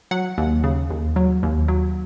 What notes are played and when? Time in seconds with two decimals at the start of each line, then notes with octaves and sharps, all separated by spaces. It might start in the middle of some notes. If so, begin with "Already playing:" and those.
0.11 F#3 F#5
0.38 D#2
0.64 C#3
0.90 D#2
1.16 F#3
1.43 D#2
1.68 F#3